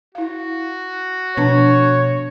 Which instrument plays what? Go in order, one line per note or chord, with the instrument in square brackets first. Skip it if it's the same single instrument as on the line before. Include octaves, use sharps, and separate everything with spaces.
[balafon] E4 F5 [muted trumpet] F#4
[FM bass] B2 [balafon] F3 D4 A5 [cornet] C#5